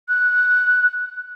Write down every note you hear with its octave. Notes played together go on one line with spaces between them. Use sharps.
F#6